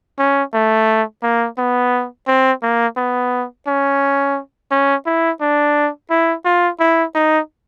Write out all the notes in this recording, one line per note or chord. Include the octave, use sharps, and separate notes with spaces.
C#4
A3
A#3
B3
C4
A#3
B3
C#4
C#4
E4
D4
E4
F4
E4
D#4